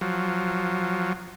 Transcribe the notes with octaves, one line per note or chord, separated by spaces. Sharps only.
F3 F#3